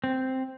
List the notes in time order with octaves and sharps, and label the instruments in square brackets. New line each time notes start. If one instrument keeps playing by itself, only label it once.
[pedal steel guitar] C4